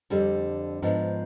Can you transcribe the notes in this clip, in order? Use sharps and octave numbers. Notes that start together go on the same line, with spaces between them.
F2 D3 G3
G#2 F3 B3 D4